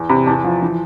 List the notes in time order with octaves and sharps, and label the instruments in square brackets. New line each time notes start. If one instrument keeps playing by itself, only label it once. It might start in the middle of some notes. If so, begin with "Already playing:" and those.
Already playing: [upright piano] E2
C3 B5
E2 A5
F3
E3